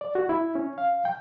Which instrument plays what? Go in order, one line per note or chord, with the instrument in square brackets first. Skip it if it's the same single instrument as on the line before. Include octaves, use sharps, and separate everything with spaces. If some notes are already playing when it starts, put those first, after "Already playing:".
[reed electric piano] D5
F#4
E4
C#4
F5
G5